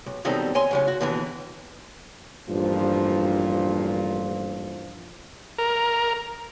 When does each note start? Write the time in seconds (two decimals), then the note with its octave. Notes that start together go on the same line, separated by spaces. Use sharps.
0.06 B1
0.25 B2 D#3 F#3 G3 C4 A4
0.55 C#5 G#5 C6
0.71 A2 C#3 F#3
0.88 F#4
1.01 D#2 B2 D3 E3
2.48 A1 G2 A#2 F3
5.58 A#4